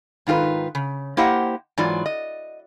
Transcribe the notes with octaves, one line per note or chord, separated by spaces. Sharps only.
G#2 D#3 F4 G4 B4
C#3
A#3 E4 G4 C5 D#5 F#5
G#2 E3 F#3 F4 D5
D#5